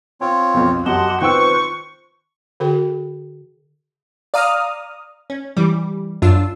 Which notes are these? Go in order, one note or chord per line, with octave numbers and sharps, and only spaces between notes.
C4 F4 C#5 G5
B1 F2
F#2 G4 D#5 F#5 A5 C6
D#3 C4 F4 B4 C5 G5 C#6 E6
D3 F#4 G#4 C5 G5
D5 F5 A#5 D#6 F6
C#4
E3 G3
F#2 D4 F4 E6